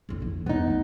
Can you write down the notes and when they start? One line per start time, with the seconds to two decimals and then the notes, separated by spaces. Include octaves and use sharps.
0.09 F2 D3
0.20 D3 E3
0.46 E2 B3 D#4
0.67 C#3 A3